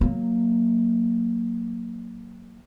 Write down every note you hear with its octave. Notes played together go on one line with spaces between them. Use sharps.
F#3 A#3